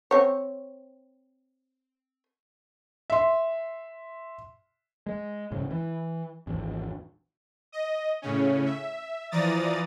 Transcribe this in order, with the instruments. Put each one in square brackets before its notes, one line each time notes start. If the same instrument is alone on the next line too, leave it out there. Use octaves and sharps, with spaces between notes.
[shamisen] C4 C#5
[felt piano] E5 C6
[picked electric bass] G#3
E1 G#2 C#3
E3
G#1 E2
[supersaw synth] D#5
A2 C#3 C#4
E5
E3 F3 D5 A#5 D#6 A6